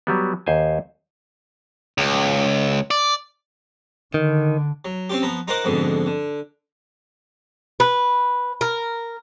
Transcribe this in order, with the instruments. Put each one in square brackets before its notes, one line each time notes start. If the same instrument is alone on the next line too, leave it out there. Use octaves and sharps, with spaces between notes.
[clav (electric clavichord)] F#3 G3 B3
D#2 C5 G#5
[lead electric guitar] C#2
D5
[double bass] D3 [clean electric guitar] D#3
[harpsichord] F#3
C4 C#4 F4 G4
F3 B3 A#5
D#4 F4 A#4 C5 F#5 D6
F2 G#2 B2 D3
D3
[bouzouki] B4
A#4